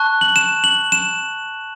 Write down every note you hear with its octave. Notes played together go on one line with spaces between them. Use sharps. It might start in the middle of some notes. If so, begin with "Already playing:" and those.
Already playing: A5 C#6 F#6
F#7
E7
F#7
E7